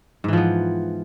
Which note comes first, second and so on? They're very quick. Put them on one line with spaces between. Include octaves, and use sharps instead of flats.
G#2 E3 F3 B3